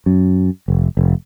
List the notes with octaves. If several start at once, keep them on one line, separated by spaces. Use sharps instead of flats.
F#2
F1
F1